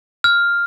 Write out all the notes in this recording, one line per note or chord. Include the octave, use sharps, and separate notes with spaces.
F6